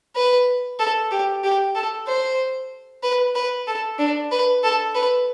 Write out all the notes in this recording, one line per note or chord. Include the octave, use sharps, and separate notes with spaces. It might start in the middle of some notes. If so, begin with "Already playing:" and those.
B4
A4
G4
G4
A4
C5
B4
B4
A4
D4
B4
A4
B4